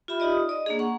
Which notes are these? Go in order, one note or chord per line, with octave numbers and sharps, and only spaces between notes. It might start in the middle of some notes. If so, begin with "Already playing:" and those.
F4 G4 E5 B5
D#4 F4 G4 D5 D#5
D#6
D5 D#5
A#3 D4 G#4
F#5 A#5 C#6